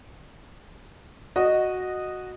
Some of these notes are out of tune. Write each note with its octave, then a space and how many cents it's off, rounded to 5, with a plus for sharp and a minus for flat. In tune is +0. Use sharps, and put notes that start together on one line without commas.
F#4 -5 D#5 -10